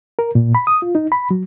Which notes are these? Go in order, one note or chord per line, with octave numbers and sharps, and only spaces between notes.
A#4
A#2
B5
D#6
F4
D#4
B5
F#3